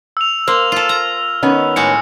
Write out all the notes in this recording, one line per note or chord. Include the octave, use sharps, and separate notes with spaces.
E6 F7
A#3 C5 F6
F4 A4
A#5
D#3 B3 C#4
A2 G#3 F#4 C#7